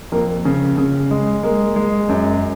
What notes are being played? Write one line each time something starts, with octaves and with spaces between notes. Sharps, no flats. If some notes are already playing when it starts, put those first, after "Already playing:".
F2 A#3
C#3
C#3
G#3
G#3 A#3
G#3
F#2